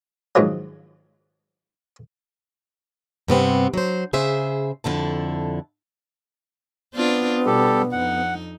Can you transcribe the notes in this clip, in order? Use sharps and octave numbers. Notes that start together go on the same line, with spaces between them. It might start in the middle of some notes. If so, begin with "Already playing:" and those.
G#2 D#3 F3 F#3
G2 C3 B3 C4
F#3 C5
C#3 G#4 C5 E5
F2 D3 E4 A5
B3 C4 D4 F4
B2 G3 G4 A4
F2 D#4 F#5